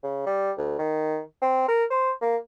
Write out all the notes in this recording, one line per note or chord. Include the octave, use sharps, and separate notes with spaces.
C#3
G3
D2
D#3
C4
A#4
C5
A#3